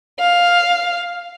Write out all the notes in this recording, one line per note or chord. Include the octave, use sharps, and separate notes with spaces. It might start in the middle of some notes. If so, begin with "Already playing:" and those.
F5